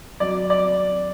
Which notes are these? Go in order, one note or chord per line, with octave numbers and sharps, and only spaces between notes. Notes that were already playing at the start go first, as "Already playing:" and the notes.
F#3 D5
D5